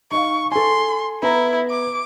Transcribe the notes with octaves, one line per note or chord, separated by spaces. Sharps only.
D#4 D#5 F5 C#6
A4 G#5 C6
B3 E4 A#5
D6